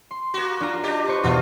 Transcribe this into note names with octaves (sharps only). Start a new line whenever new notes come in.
C6
A#3 F#4
D4 F4 A#5
D4 G4 D#5 A6 B6
B4 C5 C#6
E2 B2 D4 F4